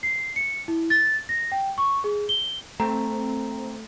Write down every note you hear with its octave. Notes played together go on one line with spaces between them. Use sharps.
C7
C#7
E4
A6
A#6
G5
C#6
G#4
G7
A3 C4 A#5